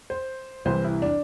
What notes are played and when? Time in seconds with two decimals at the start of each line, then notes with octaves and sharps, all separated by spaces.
0.10 C5
0.65 C2 C3 E3 C5
0.84 E4
1.02 D4